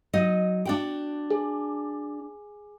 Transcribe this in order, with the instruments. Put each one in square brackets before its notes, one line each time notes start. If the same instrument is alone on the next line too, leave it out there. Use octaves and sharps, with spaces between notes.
[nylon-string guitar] F#3 D#4 D#5
D4 F#4 G5
[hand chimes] G#4